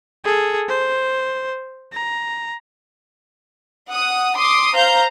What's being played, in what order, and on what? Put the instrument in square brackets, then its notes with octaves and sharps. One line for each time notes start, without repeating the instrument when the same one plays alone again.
[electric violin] G#4 A4
C5
A#5
[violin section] F#5 D#6
C6 D6 D#6
C5 F5 A#5 G6